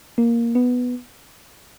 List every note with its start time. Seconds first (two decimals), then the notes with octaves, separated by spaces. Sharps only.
0.18 A#3
0.55 B3